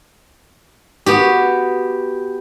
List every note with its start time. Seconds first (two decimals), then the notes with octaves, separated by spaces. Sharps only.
1.06 B3 F#4 G4